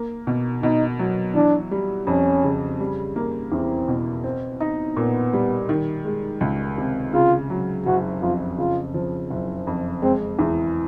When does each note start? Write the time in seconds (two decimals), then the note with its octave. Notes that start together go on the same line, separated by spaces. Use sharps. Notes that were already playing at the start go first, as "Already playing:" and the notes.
Already playing: A#3
0.27 B2
0.63 B2 D#4
0.99 F#3
1.35 E3 D4
1.71 G3
2.07 F2 C#4
2.44 C#3
2.80 G3
3.16 A#3
3.52 E2 C4
3.88 B2
4.24 C4
4.61 D#4
4.97 A#2 B3
5.33 G3
5.69 D#3
6.05 G#3
6.41 C#2
6.78 C3
7.14 C#3 F4
7.50 F#3
7.86 F#1 F#4
8.22 F2 F4
8.58 C#3 F4
8.94 F3
9.31 F#1
9.67 F2
10.02 G#3 C4
10.39 E2